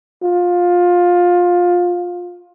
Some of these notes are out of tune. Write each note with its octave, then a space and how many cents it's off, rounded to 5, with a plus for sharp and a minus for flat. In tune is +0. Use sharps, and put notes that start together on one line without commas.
F4 +20